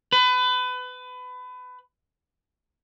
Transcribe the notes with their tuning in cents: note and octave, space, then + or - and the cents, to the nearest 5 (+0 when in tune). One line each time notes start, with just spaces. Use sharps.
B4 +25